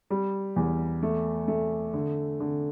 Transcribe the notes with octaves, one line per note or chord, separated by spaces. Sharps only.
G3
E2
A3
A3
D3
D3